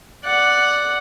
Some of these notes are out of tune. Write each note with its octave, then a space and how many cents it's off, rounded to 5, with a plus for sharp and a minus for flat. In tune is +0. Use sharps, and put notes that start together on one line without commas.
D5 +0 F#5 +0